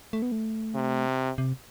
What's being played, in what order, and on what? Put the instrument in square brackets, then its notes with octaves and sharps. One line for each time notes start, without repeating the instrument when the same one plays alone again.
[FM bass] A3
B3
A3
[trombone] C3
[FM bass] C3